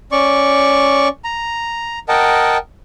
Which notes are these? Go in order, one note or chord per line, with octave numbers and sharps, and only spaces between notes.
C#4 D5 C#6
A#5
A#4 D#5 F#5 G5 A5